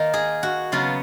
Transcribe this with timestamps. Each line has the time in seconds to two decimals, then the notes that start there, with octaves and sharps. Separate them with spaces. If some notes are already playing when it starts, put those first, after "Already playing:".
Already playing: D#3 A#3 D#4 F4 A#4
0.13 G#4
0.43 F#4
0.72 C#3 F#3 B3 F4